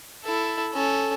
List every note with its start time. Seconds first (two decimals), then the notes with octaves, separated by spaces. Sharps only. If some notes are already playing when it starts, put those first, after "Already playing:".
0.24 E4 A4
0.73 C#4 A4